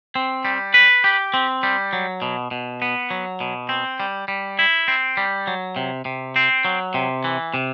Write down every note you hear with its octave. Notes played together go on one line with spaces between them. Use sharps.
C4
G3
B4
G4
C4
G3
F#3
B2
B2
B3
F#3
B2
C4
G3
G3
E4
C4
G3
F#3
C3
C3
C4
F#3
C3
E3
C3